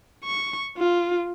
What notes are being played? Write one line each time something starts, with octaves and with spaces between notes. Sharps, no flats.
C#6
F4